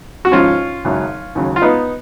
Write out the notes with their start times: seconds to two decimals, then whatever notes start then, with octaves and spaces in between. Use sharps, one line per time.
0.25 F#4
0.32 G#1 G#2 F3 C#4 F4
0.85 G#1 F#2 C#3 F#3
1.35 D#2 C#3 F#3
1.56 F4
1.62 B3 D#4